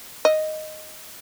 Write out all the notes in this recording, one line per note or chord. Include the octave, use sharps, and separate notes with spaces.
D#5